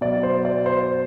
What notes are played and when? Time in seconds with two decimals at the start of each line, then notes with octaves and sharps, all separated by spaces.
0.01 B2 F#3 B3 D5
0.23 C5
0.45 D5
0.66 C5